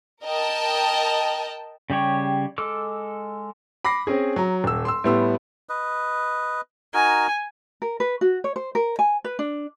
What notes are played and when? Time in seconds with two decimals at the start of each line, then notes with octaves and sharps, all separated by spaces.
0.23 A#4 D#5 G5 A5
1.90 C#3 G3 G4 C#5
2.58 G#3 A4 D6 E6 F6
3.85 B5 D6 A#6 C7
4.07 C4 C#4 G#4
4.36 F#3 A#5
4.64 D#1 E6
4.85 C6 E6
5.04 A2 G3 B3 C6 E6
5.69 B4 D#5
6.94 D#4 F#4 A#4 G#5
7.82 A#4
8.00 B4
8.21 F#4
8.44 C#5
8.56 C5
8.75 A#4
8.99 G#5
9.24 B4
9.39 D4